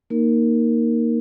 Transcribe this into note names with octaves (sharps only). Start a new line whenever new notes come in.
A#3 D#4 A#4